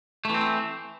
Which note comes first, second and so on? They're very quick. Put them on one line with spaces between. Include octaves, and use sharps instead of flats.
A3 E3 C4